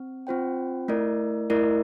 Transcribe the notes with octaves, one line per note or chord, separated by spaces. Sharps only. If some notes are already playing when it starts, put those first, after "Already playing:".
Already playing: C4
C4 F4 C5 G5
A3 E4 A#4 D5
A3 E4 A#4 D5